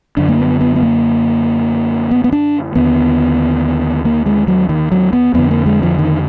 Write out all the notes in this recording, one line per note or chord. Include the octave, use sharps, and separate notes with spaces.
F#2 D3 D4
A#3
B3
B3
B3
A#3
B3
B3
D4
D#2 D3 B3
A#3
G#3
F#3
D#3
F#3
B3
F2 D3 B3
A#3
G#3
F3
D#3